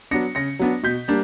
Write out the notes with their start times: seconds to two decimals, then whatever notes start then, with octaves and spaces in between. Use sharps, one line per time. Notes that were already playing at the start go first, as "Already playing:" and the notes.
0.11 F#3 B3 D4 A#6 C#7
0.35 C#3 A#6 C#7
0.59 F#3 B3 D4
0.83 B2 G6 B6
1.08 G3 A#3 D4